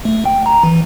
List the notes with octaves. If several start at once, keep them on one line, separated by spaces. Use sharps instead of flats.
A3
G5
A#5
E3